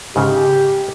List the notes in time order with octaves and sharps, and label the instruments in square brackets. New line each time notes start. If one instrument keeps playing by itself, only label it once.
[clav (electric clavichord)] G#2 C#3 [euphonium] G4